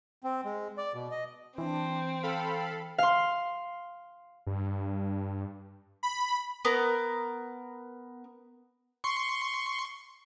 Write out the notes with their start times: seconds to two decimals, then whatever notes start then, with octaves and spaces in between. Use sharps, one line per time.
0.24 C4
0.45 G#3
0.78 D5
0.94 B2
1.11 D#5
1.58 E3 C4 D4
2.23 A4 F5 G5 B5
2.98 F5 C6
4.47 G2
6.03 B5
6.65 B3 A#4
9.04 C6 C#6